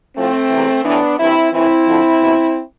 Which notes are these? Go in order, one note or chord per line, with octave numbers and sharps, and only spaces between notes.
A2 F3 A3 C4
E2 C3 E3
A2 E3 B3 D4
G2 E3 C4 E4
A2 E3 C4 E4
F2 D3 F3
E2 B2